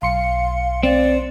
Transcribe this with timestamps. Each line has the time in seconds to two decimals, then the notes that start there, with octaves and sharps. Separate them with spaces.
0.02 B1 F5 C6 C#7
0.83 C4 D5